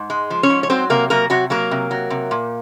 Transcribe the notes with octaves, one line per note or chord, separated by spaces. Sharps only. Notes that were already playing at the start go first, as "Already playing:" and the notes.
Already playing: G#2
G#3
F3
C#4 C#5
G#2
C#5
F#3 C4 C5
C3 A#3 A#4
F#3 A#3 A#4
C3 F#3 F#4
F#3 A#3 A#4
C3
F#3
C3
A#2